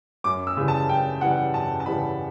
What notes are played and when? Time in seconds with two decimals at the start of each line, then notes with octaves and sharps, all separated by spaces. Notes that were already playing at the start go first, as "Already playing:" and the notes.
0.24 F#2 D6
0.47 E6
0.57 C#3 E3 G3
0.68 A5
0.89 F#2 G5
1.21 C#3 E3 G3 F#5
1.54 F#2 A5
1.80 A5
1.86 C#3 E3 G3 B5